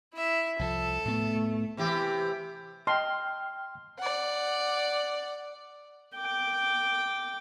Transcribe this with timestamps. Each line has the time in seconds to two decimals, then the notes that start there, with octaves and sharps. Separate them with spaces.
0.15 E4 E5
0.59 C2 F3 A4
1.05 A2 A3 B3
1.77 C3 E3 G4
2.87 D#5 G5 A5 C6 F6
3.98 D5 F#5
6.16 G5 D6